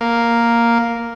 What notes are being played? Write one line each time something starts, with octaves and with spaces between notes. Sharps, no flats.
A#3